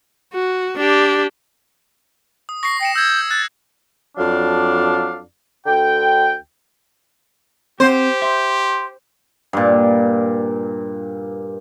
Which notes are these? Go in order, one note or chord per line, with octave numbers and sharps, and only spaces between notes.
F#4
D4 G4
D#6
C#6 A#6 C7
G5 A#6 C#7 E7
E6 G6 G#6
F#6 A6
F2 F#3 D4 D5 F5
D2 D3 G5
C4 G4 C5 F#5
E5 C6
G2 A#2